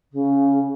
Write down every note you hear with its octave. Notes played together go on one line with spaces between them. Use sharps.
C#3